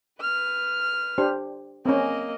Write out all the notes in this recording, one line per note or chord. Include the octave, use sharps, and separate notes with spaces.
B4 F6
D4 G4 C5
A#3 C4 C#4 D#5